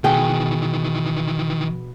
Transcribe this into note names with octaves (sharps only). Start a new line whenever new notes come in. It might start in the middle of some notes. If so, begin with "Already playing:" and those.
B2 D#3 E3 G#4 G5